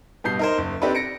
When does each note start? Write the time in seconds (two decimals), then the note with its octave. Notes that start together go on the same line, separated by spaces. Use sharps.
0.24 G2 B2 G6 C7
0.39 D#4 A#4 C5
0.58 F#1
0.82 C4 D4 D#4 G4 A4 B4
0.95 A#6 C#7 D7